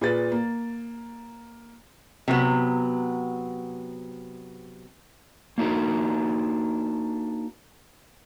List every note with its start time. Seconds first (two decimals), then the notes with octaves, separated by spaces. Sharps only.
0.01 A#2 G#4 B4 A6
0.32 A#3
2.28 C3 F#3 B3
5.58 A#3 D4 D#4 F#4 A#4